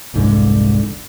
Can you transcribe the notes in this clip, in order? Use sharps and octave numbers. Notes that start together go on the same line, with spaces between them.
F1 C2 G#2 D3